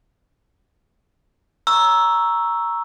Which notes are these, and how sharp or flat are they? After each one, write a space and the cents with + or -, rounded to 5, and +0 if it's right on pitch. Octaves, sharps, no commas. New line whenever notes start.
A#5 +5 C#6 +0 E6 +0